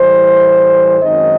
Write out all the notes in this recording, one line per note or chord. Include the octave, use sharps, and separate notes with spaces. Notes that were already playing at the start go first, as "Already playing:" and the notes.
Already playing: A2 E3 G3 C5
F#2 D#3 G#3 C4 D#4 D#5